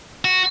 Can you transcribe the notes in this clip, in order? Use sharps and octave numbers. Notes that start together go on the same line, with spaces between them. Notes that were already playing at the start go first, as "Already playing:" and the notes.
F#4